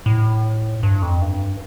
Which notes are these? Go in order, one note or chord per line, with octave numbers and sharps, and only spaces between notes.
A2
G2
F2
G2